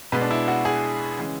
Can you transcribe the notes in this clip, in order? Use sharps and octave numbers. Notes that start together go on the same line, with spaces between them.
B2 G#3 B3 B4
D4
E4
F#4
G#4
C#3 E3 G#3